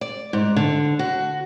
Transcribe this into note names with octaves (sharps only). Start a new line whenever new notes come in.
D5
G#2
D3
F#4